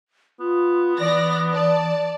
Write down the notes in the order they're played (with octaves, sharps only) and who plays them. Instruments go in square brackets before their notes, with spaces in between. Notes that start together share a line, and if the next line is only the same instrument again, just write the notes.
[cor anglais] B3 [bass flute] F4
[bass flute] E3 [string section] D5 A#6
[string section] D5 A5